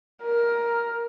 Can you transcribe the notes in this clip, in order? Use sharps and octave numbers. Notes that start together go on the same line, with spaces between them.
A#4